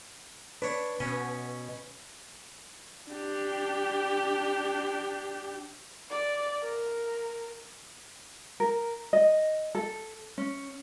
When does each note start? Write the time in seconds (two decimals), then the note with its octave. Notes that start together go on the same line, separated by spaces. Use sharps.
0.62 D4 B4 C#5
1.00 B2 C#4
3.09 D4 G4
6.10 D5
6.63 A#4
8.60 A#4
9.13 D#5
9.75 A4
10.38 C#4